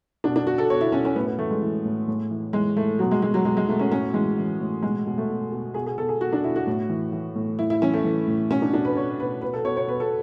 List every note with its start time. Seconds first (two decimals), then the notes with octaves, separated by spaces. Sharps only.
0.24 B2 D4
0.36 D4
0.47 B2 F#4
0.58 A4
0.70 B2 C#5
0.81 E4
0.92 B2 C#4
1.05 C#4
1.16 A2 B3
1.27 B3
1.38 E3 A3
1.51 G#3
1.62 E3
1.85 A2
2.08 A2
2.31 E3
2.53 E3 G#3
2.76 A2 A3
2.99 B2 F#3
3.11 G#3
3.22 B2 G#3
3.34 F#3
3.45 B2 G#3
3.57 G#3
3.68 B2 A3
3.79 C#4
3.91 A2 C#4
4.14 E3 G#3
4.38 E3
4.60 A2
4.83 B2 G#3
5.07 B2
5.18 A3
5.29 B2
5.52 B2
5.74 B2 G#4
5.86 G#4
5.98 B2 A4
6.09 G#4
6.21 B2 F#4
6.33 D4
6.44 B2 E4
6.56 F#4
6.67 A2
6.89 E3
7.13 E3
7.35 A2
7.59 A2 E4
7.70 E4
7.82 E3 C#4
7.94 A3
8.04 E3
8.27 A2
8.50 B2 C#4
8.62 D4
8.73 B2 D4
8.85 B4
8.96 B2 C#5
9.19 B2 B4
9.42 B2 B4
9.54 A4
9.65 B2 C#5
9.77 C#5
9.87 B2 B4
10.00 A4